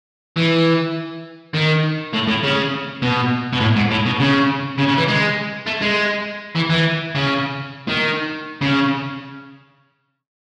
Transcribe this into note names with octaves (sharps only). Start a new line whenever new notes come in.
E3
D#3
A2
A2
C#3
B2
B2
A2
G#2
A2
B2
C#3
C#3
C#3
E3
G#3
A3
G#3
E3
E3
C#3
D#3
C#3